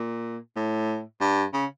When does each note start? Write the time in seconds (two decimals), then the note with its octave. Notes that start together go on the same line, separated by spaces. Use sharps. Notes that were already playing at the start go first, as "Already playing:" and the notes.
Already playing: A#2
0.56 A2
1.21 G2
1.53 C#3